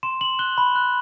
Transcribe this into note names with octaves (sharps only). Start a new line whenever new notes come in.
C6 E7
C6 F#7
F#6 G7
B5
F#6